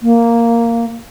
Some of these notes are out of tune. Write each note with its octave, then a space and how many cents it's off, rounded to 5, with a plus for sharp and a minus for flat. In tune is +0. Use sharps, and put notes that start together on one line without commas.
A#3 -5